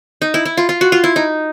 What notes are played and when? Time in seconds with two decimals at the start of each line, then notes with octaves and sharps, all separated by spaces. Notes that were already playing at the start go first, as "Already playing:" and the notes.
0.22 D#4
0.34 E4
0.45 E4
0.57 F4
0.69 F4
0.81 F#4
0.92 F4
1.04 E4
1.16 D#4